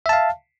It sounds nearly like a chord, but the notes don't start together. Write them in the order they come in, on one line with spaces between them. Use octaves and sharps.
E5 A5 F5